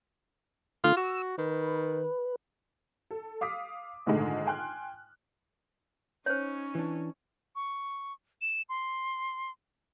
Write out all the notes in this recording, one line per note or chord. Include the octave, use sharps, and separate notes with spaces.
D3 A3 F4
F#4 E6
D#3 B4
A4
F5 D6 D#6 B6
A#1 G#2 D3 D#3 G#3 A3
G5 G#5 C6 F6 F#6
C#4 D#4 C5 C#5
E3 D4
C#6
E7
C6